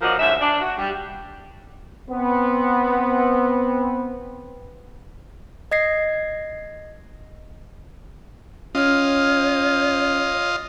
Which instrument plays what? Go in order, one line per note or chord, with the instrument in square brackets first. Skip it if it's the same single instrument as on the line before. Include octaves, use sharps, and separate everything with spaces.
[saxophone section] A#2 F3 F#3 D4 A#4 D#5
G#2 D3 A3 C#4 E5
D4
F#4
G3
[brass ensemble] B3 C4
[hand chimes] D#5 G#6 A#6 C7
[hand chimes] C#4 F6 [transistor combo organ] F4 D#5 [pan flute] C#5